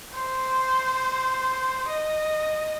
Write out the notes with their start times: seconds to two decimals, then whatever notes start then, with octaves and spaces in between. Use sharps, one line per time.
0.14 C5
1.89 D#5